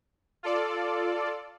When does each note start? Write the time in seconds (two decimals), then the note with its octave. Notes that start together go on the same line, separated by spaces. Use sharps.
0.43 F4 A4 D5